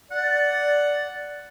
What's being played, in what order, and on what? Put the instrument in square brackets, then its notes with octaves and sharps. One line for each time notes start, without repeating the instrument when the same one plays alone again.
[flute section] D5 [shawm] F#5